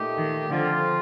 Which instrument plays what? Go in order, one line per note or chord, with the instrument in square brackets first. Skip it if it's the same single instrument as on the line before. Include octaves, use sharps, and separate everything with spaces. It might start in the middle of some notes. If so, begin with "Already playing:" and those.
Already playing: [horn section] A#2 A3 D#4 G4
[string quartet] D#3
[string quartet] D3 [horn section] F3 C4 F4 A4